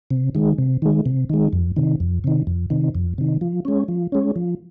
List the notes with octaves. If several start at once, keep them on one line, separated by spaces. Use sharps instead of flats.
C3
D#3 G#3
C3
D#3 G#3
C3
D#3 G#3
F2
C3 D#3
F2
C3 D#3
F2
C3 D#3
F2
C3 D#3
F3
G#3 C#4
F3
G#3 C#4
F3